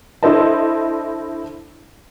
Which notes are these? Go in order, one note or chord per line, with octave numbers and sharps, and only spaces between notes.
D4 E4 A4 C5 D#5 A5